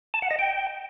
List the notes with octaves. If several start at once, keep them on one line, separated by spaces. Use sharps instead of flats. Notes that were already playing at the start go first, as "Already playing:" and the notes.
A5
F#5
D#5
G5